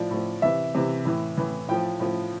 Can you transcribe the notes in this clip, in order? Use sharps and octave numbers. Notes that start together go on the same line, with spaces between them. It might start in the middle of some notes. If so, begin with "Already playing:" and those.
Already playing: A2 F3 D5
A2 F3
C3 E3 E5
C3 E3
A2 E3
A2 E3
A2 F3 G5
A2 F3